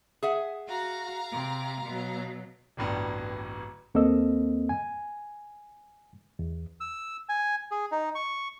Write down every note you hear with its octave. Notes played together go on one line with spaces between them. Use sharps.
G#4 E5 F#5
F#4 F5 A#5
C3
B2 F#3
D1 A1 G2 B3
D#2 A#3 C4 A4 D#5 E6
G#5
E2
E6
G#5
G#4
D#4
C#6